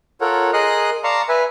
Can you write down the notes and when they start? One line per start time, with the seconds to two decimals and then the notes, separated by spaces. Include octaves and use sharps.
0.21 F4 A4 A#4 C#5 F#5
0.53 G#4 A#4 D#5 C6 D#6 F#6
1.04 D5 F5 A5 A#5 C6 C#6
1.29 B4 E5 G#5